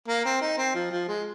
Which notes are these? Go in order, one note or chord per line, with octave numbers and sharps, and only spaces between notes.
A#3
C4
D#4
C4
F3
F3
G#3